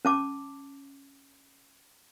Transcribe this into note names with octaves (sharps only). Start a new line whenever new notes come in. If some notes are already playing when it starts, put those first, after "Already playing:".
C#4 A5 D6